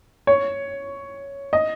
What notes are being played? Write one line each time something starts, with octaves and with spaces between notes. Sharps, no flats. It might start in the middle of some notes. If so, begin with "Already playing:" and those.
C#5
D#5